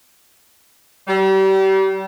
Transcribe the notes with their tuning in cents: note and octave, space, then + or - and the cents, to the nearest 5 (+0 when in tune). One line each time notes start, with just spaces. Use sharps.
G3 -35